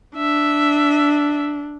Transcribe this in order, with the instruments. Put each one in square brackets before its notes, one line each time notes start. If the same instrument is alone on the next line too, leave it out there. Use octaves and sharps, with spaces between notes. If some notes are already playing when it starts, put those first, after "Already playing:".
[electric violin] D4 [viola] E5